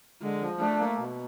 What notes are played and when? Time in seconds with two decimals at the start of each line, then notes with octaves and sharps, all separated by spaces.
0.22 D3 G#3
0.42 F3
0.60 A3 D4
0.79 A#3
0.98 B2